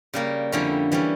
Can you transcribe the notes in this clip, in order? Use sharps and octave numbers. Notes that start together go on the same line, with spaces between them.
C#3 G3 A#3
F2 D3 G3 C#4 E4
E3 G3 C#4